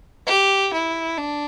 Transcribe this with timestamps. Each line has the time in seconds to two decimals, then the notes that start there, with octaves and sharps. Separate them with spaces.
0.27 G4
0.73 E4
1.17 D4